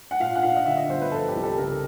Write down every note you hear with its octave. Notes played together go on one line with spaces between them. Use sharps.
F#5
A#2 F5
F#5
A#2 F5
D#5
D3 E5
D#5
G1 C5
B4
F3 A4
G4
C2
A4
C#3 A#4